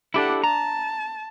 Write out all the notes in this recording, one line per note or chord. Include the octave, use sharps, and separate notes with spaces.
D4 E4 G4 A4 F#5
A5 A#5